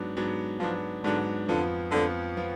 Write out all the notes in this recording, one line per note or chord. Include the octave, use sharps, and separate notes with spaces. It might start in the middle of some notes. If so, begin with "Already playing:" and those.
Already playing: G#2 F#3 B3 D4
G#2 F#3 B3 D4
G#2 F3 F#3 B3 D4
G#2 D3 F#3 B3 D4
F2 D3 F3 B3 F4
F2 D3 F3 B3 F4
F3 B3 F4